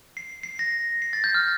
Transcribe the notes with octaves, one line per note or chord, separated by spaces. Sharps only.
C7
C7
A#6
C7
A6
G6
F6